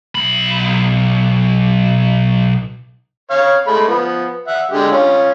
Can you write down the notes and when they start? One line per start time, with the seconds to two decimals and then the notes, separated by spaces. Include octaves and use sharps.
0.15 B1 B5
3.30 C#5 F5
3.67 G#3 A3 B5
3.88 F3 B3
4.47 E5 F#5
4.71 D3 G#3 G4
4.92 C#4 F4